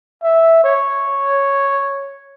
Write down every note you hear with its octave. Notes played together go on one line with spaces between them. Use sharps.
E5
C#5